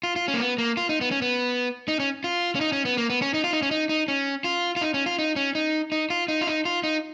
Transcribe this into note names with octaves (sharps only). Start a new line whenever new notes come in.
F4
F4
C#4
A#3
B3
A#3
F4
D#4
B3
C#4
B3
D#4
C#4
F4
C#4
D#4
C#4
B3
A#3
B3
C#4
D#4
F4
D#4
C#4
D#4
D#4
C#4
F4
F4
D#4
C#4
F4
D#4
C#4
D#4
D#4
F4
D#4
F4
D#4
F4
D#4